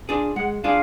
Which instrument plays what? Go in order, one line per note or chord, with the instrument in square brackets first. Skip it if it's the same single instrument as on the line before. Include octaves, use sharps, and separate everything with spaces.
[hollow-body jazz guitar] D4 F4 G#4 D5
[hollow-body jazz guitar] G#3 [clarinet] F#5
[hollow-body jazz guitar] D4 F4 G#4 D5 [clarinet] F5